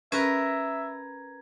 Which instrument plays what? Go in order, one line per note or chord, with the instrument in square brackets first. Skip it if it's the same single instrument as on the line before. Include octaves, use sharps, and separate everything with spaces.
[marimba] C#4 [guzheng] A#4 B4 [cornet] E5 [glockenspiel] G#6